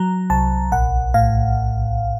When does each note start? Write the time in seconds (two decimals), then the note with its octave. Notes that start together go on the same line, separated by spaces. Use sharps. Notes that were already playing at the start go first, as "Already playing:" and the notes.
Already playing: F#3 A#5
0.30 C2 A5
0.72 A#1 F#5
1.14 A2 F5